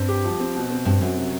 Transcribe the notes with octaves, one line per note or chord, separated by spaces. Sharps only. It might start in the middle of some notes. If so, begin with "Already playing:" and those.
Already playing: G2 C4
G4
F3
C4
B2
C4
G2 C4
F#2 F#4
C3